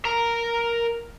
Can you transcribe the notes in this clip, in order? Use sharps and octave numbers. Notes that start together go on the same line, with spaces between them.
A#4 A#5